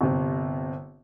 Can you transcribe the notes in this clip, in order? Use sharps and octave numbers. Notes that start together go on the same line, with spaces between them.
G1 C3